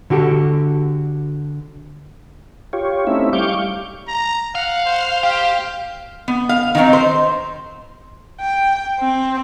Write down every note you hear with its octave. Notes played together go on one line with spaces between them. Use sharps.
D3 F#4 G4 A4
F4 G4 C#5
A3 C4 C#4 D#4 E4 E5
G3 F5 C#6 D6 G6
A#5
F5 F#5
C5
G4 F5
B3
F5
D#3 F#3 G3 C4 D#4
C5
G5
C4